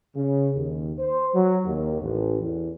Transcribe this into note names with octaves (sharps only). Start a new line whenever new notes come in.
C#3
D#2
C5
F#3
D#2
A1
E2